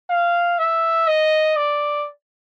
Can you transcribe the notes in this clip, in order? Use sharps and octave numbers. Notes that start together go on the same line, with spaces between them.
F5
E5
D#5
D5